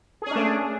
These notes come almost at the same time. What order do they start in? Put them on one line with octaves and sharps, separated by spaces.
G#4 C#4 D4 A3